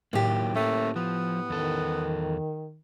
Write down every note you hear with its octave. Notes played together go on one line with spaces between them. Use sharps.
A2 D#3 F#3 A#3 G4
A3 A#3 C#4
F3 B3
E2 D#3 A4